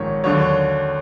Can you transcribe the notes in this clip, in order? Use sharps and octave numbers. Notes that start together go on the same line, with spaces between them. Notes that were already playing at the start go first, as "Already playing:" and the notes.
Already playing: A#1 G#2 D#3 C#5
D#2 D3 F#3 C#5
C#5